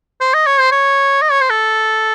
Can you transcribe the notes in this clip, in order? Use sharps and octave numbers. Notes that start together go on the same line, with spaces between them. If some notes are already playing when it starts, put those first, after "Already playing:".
C5
D#5
C#5
C5
C#5
D#5
C#5
C5
A4